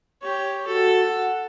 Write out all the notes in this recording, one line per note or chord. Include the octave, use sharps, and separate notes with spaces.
G4 C#5
F#4 A4
F#5